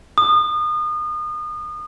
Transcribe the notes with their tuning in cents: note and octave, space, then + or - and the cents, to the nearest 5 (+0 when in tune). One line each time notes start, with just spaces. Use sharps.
D#6 -30